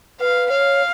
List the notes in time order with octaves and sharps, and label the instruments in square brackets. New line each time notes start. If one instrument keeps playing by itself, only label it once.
[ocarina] B4 [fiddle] F5
[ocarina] C#5 [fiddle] F5